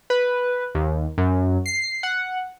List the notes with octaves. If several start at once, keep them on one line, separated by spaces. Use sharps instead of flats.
B4
D#2
F#2
C7
F#5